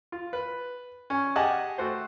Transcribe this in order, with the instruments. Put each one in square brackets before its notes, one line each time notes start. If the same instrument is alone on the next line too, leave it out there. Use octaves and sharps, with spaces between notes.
[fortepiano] F4
B4
C#4
G4 G#4 D#5 F#5 G#5 A5
A3 F#4 C5